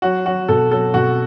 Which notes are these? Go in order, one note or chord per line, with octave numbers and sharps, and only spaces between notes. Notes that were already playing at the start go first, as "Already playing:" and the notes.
F#3 F#4
F#3 F#4
B2 A4
F#3 A4
B2 F#4